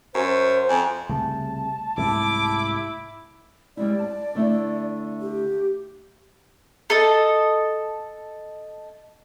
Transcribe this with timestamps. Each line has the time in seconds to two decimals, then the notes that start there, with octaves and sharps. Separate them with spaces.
0.14 F#2 C5
0.69 F2 G#5
1.09 C2 C#3 A3 A5
1.97 C2 G#2 A3 E4 D6
3.77 G3 G#3 E4 D5
3.99 A5
4.35 D3 A3 E4
5.22 G4
6.90 A4 D#5